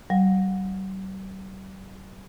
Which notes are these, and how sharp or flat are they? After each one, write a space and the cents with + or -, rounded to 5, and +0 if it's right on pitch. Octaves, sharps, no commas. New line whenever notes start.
G3 -45 F#5 -40